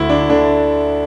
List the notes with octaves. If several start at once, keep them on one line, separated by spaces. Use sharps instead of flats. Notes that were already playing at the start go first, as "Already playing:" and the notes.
Already playing: D2 E4
D4
D3 D4